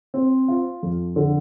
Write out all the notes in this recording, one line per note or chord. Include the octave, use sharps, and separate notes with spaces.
C4
F4
F2
D3